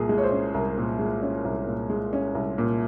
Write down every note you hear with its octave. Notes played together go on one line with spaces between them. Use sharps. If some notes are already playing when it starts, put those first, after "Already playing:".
Already playing: C2 A#2 G#4
G#3
C#5
C5
C#4
C2 A#4
A#2
G#3
C#4
C2
A#2
G#3
C#4
C2
A#2